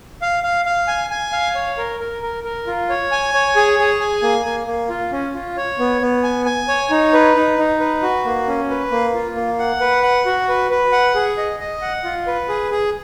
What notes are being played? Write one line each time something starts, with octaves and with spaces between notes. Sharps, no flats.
F5
F5
F5
G#5
G#5
F5
C#5
A#4
A#4
A#4
A#4
F4
C#5
G#5
C#5
G#4
G#4
G#5
A#3
A#3
A#3
F4
C#4
F4
C#5
B3
B3
G#5
G#5
C#5
D#4
B4
D#4
D#4
B4
F#4
A#3
C#4
B4
A#3
F4
A#3
F#5
B4
F#5
F#4
B4
B4
F#5
G#4
D#5
D#5
F#5
F4
B4
G#4
G#4